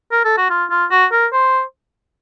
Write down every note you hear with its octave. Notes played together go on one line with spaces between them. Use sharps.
A#4
A4
F#4
F4
F4
F#4
A#4
C5